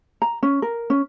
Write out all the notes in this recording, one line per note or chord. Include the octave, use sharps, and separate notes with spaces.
A#5
C#4
A#4
C#4